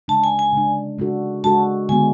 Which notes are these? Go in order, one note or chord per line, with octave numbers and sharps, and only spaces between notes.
C#3 G#3 D4 A5
G#5
G#5
C#3 G#3 D4
C#3 G#3 D4 F#4 A4
C#3 G#3 D4 F#4 A4 A5
D3 G#3 B3 F#4 G#5